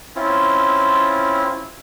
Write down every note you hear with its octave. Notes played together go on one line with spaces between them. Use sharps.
C4 C#4 E4 F4